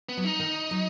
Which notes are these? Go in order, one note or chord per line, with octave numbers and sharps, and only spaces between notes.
B3
F#3
D#4
D#3
F#3